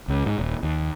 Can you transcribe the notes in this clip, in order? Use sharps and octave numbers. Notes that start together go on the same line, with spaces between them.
C#2
G#2
D#1
D#2